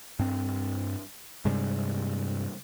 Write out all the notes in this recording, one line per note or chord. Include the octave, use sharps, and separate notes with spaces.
G2 C4
G2 C3 G3 G#3